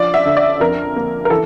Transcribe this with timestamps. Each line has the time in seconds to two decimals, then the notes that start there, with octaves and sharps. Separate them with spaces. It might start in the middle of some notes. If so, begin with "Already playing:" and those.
Already playing: F3 D4 D5
0.14 E5
0.25 D3
0.37 D5
0.60 F2 A#4
0.96 A#3
1.25 A#4
1.30 E3 A4